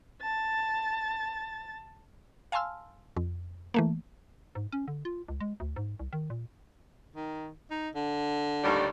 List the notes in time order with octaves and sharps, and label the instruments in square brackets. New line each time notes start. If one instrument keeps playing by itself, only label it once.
[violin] A5 A6
[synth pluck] F5 G#5 A5 C6 E6 F6
F2
E3 A3 A#3
[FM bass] G#2
C#4
D3
F4
C#2
G#3
D2
G#2
C2
D#3
A#2
[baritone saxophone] D#3
D#4
D3
[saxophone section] D#2 A2 G3